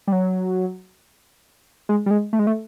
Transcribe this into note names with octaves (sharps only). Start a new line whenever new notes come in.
G3
F#3
G#3
G3
G#3
A3
G#3
A3